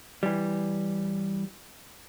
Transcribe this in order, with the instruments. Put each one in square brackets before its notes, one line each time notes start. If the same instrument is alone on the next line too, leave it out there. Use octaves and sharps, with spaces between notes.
[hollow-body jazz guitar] E3 G3